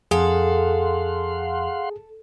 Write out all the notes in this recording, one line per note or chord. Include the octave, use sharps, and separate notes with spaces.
F2 G#4 A4 F5 F#5 C6